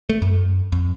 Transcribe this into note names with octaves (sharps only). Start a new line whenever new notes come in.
A3
F#2
F2